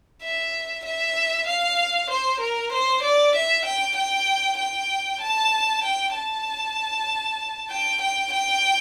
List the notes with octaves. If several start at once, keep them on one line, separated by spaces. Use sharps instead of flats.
E5
E5
F5
C5
A#4
C5
D5
E5
G5
G5
G5
A5
G5
A5
G5
G5
G5